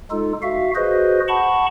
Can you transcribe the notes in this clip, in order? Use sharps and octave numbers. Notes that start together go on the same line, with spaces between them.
G#3 D#4 F4 A4
F#4 E5 F5
F#4 G#4 B4 C5 D#5
F#5 A5 B5 C#6